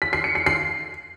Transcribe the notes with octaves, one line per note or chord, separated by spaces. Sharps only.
B6
C7
C#7
C7
C7